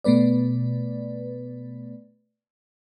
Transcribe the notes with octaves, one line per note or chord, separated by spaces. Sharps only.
B2 A3 B3 B4 D5